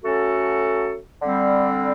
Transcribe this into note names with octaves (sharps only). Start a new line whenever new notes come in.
F#3 A3 C#4 F#4 A4
D3 G3 C4